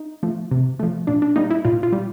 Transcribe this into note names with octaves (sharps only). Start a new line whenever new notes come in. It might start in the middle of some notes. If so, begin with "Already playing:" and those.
Already playing: D#4
F3 A3
C3
F3 A3
A#2 D4
D4
G3 A#3 D#4
E4
A#2 F4
F4
G3